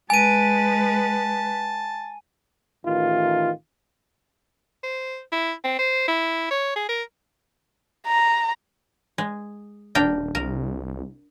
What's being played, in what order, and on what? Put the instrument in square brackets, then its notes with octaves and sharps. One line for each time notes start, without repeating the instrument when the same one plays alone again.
[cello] G#3 B4 [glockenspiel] G#5 D#7 [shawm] A5
[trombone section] A1 D#3 E3 F4
[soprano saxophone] C5
E4
C4
C5
E4
C#5
G#4
A#4
[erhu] A#5
[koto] G#3
[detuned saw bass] D#1 [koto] D4 A#4 G5
[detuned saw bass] C2 [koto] A#4